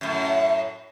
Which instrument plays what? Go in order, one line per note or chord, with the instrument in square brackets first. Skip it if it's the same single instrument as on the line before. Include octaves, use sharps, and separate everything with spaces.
[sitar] F#2 A2